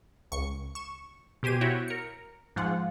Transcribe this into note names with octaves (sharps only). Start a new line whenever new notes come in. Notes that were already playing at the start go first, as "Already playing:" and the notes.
C#2 C#6 C#7
C#6 E7
B2 G4 C5 G#5 D#7
E4 F#4 C#5 E5 F#5 G5
A#4 C#7
G#2 F3 F4 F#5